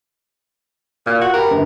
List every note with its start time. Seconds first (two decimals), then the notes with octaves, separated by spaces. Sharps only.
1.07 A#2 F4
1.21 F#4
1.34 G4 A#4 B5
1.51 G1